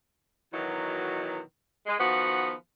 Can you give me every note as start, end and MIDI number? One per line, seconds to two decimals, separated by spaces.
0.52 1.39 47
0.52 1.39 51
0.52 1.39 52
0.52 1.39 54
1.86 1.94 56
1.99 2.51 51
1.99 2.51 53
1.99 2.51 59
1.99 2.51 66